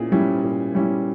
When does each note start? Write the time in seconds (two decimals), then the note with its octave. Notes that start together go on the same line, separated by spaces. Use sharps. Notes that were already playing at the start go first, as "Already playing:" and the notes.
Already playing: A#2 C#4 E4 G#4
0.12 G3 C#4 E4
0.44 A#2
0.75 G3 C#4 E4